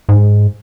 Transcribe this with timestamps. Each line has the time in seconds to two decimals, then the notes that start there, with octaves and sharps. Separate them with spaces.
0.09 G#2